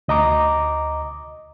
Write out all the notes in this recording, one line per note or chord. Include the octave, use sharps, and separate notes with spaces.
D2 D#5 A#5 D6